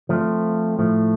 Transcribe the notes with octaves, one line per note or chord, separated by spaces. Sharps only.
F3 A3 C4 F4
A2 F3 A3